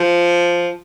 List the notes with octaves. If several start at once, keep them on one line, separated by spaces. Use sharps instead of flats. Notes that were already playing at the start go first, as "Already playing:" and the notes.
Already playing: F3